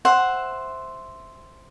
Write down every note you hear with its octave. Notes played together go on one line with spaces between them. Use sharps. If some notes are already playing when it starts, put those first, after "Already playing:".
C5 E5 F#5